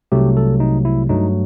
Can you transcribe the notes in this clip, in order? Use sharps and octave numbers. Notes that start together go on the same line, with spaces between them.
C2 C3 F#3 A3 G4
A4
D#4
E4
G2 F#3 A3 D#4